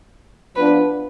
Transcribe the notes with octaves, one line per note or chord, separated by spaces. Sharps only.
F3 B3 D4 F4 B4